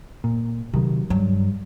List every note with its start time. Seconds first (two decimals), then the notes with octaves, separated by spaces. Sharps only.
0.24 A#2
0.74 C3 D#3 F#3
1.10 G2 F#3